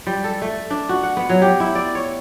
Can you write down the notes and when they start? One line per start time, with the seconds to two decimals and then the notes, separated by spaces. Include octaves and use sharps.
0.07 G3
0.24 A4
0.41 A3
0.70 D4
0.89 F#4
1.03 F#5
1.17 B3
1.30 F#3
1.42 G4
1.60 E4
1.75 D5
1.95 C#5